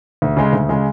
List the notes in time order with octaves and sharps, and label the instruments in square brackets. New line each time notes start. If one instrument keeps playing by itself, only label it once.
[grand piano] D2
C#3 G#3
D2
C#3 G#3